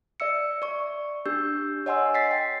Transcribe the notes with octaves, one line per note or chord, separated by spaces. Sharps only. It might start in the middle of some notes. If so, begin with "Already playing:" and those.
D5 E5 E6 C#7
D5 C#6
D4 G4 E6 G6
C#5 D#5 F#5 G#5 C6 E6
A6 B6 C7
G5